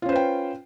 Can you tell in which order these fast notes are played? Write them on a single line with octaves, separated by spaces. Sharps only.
F4 C#4 C5 B4 G5